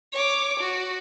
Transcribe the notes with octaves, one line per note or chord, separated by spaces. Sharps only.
C#5 D6
F#4